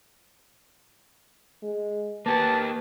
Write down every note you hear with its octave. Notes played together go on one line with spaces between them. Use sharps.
G#3
A#3 G4 B4 A5